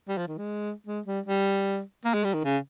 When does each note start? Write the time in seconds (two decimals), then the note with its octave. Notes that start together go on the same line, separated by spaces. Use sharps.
0.08 G3
0.18 F3
0.28 D#3
0.37 G#3
0.87 G#3
1.06 G3
1.26 G3
2.05 A#3
2.14 G#3
2.24 G3
2.34 D#3
2.44 C#3